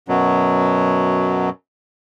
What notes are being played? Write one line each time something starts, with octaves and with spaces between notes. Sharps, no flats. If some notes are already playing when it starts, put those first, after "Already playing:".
F#2 B2 F#3